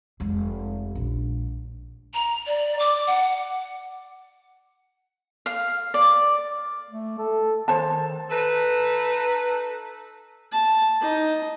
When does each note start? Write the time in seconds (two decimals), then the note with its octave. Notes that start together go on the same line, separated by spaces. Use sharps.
0.20 F1 G#3
0.95 A#1
2.14 A#5
2.47 D5
2.79 D6
3.07 F#5
5.46 F5
5.94 D5
6.90 A3
7.19 A4
7.68 D#3 C5 A5
8.30 D#4 A4 B4
10.52 A5
11.01 D#4